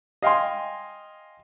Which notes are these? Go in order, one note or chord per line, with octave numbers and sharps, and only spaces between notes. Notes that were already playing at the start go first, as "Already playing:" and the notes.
D#5 F5 G5 G#5 C6